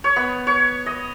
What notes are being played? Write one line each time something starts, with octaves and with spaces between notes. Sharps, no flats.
C#5
B3
C#5
D#5